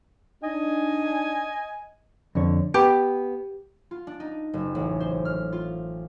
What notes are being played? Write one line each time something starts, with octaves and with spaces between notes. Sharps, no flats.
D4 D#4 D#5 G#5
F2 D3 C#5
B3 G4 B4
F4
D4
D#4
F#1
A1
C5
F6
F4